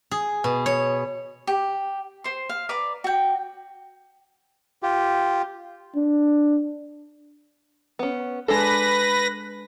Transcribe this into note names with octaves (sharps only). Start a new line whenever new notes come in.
G#4
B2
C#5
G4
C5 C6
F5
B4 D5 A#5 D6
F#4 G5
F4 G4
D4
B3 C#4
G#3 D4 A4 B4 A#6